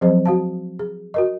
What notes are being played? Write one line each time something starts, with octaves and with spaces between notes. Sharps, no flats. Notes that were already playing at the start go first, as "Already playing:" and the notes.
F3 F#3 C4 G#4 C5 D#5
F#4 F5 A5
G#4
F#4 A#4 D#5